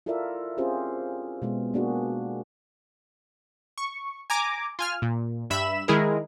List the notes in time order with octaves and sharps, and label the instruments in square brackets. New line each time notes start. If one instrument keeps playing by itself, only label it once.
[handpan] E4 F4 A4 A#4 D5 E5
C4 C#4 F4 G4 G#4 C5
B2 G#3 B3
A#3 D4 F#4 G#4
[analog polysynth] C#6
G#5 A#5 D6
F4 G#5 F6
A#2
G2 E5 B5 E7
D#3 G#3 E4 G#4 A#4